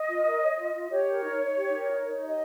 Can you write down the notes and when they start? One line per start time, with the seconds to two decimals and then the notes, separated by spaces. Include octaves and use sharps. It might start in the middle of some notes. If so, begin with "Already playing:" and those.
Already playing: D#5
0.09 F4
0.25 A#4
0.42 C#5
0.58 F4
0.74 F4
0.90 G4 C#5
1.08 A#4
1.24 D#4
1.40 D#4
1.57 G4
1.73 A#4
1.90 D#4
2.06 D#4
2.23 G4 D#5